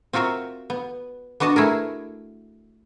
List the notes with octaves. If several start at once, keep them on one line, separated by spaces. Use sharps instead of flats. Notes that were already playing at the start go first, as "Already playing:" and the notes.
C4 F4 F#4 A#4 E5
B3
B3 D4 F#4 D#5 A5
A3 E4 G#4 A#4